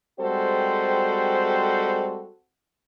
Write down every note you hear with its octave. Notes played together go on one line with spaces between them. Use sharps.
G3 G#3 C4 F#4 A4 C5